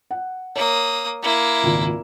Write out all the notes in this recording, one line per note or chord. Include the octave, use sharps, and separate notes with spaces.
F#5
A#3 C#5 D#6
A#3 E4
G#1 C#2 A#2